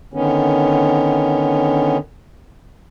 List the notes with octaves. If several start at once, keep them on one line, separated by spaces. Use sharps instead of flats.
D3 D#3 B3 C#4